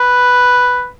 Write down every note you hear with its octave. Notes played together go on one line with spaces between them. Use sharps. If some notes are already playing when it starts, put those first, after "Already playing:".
Already playing: B4